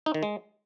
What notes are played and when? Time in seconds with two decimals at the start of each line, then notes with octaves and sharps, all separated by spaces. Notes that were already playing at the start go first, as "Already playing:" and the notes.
0.06 D#4
0.14 D#3
0.23 G#3